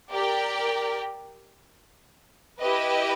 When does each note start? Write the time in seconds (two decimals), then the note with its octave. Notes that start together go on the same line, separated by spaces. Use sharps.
0.12 G4 A#4 D5 G5
2.60 E4 G4 B4 D#5